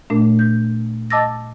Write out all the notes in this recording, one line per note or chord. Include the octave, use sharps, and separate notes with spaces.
A#2 A3 D4
G6
D#5 A5 D6 E6 A6 A#6